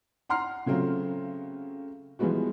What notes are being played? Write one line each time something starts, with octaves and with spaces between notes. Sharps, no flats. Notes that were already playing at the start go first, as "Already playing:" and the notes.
F#5 A#5 C6 F6 C7
C#3 F#3 A3 C4 F4
E3 F3 G3 G#3 B3 F#4